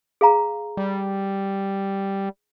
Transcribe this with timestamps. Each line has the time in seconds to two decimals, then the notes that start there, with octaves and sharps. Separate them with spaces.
0.21 G#4 F5 A#5
0.77 G3